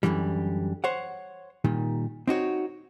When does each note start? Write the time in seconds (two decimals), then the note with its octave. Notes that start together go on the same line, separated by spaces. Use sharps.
0.03 F#2 B2 D3 E3 G3
0.84 C5 C#5 F#5
1.64 A#2 D#3 G3
2.27 C4 D#4 F#4 C#5